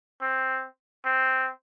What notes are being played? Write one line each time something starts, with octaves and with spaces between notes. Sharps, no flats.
C4
C4